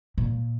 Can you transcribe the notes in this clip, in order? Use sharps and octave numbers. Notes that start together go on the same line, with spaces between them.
A#2